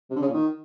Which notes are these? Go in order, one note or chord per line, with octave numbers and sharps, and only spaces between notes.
C3
D3
C#3
A#2
D#3